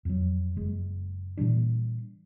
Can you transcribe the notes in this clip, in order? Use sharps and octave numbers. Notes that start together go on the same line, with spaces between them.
F2 F#3
F#1 G#3
A#2 E3 G3 D4